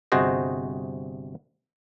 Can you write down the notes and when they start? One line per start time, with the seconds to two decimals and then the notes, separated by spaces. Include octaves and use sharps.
0.12 G1 C3 F#4 G#4 C5 D#5